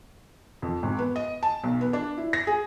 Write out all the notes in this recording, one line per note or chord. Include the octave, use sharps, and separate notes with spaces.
F2
G#1
B3
D#5
A5
B1
B3
D4
E4
A#6
G#4